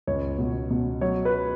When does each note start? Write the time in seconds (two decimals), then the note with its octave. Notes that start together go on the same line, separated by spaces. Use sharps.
0.07 C#2 C#5
0.39 B2
0.70 B2
1.01 F#3 C#5
1.25 B4